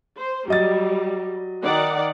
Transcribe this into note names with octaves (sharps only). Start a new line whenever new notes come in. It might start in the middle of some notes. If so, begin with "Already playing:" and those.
C5
F#3 G3 D#5 A6
D#3 D5 F#5